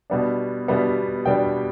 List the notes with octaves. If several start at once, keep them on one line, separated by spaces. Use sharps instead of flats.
B2 G3 B3 D4
B2 G3 B3 D4
B2 G3 B3 D4 G5